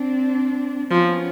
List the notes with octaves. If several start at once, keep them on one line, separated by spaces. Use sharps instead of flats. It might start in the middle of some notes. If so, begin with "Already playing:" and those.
Already playing: C4 D4
F3 B3 C#4